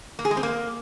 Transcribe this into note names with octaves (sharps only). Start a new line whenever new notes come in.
A#3
G#4
G#3
C4
A#3